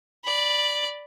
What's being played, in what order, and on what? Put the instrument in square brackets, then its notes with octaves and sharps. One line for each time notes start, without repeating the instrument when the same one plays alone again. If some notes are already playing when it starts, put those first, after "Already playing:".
[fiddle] D5 B5